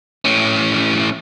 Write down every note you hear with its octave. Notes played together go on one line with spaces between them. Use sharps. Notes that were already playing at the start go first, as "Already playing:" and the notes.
A2 C#4